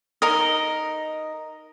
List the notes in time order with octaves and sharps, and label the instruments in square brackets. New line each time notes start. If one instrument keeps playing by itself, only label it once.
[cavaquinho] D#4 A#4 D#5